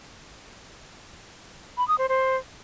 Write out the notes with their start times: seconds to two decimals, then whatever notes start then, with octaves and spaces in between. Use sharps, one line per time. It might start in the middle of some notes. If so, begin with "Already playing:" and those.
1.77 B5
1.88 D#6
1.98 C5
2.09 C5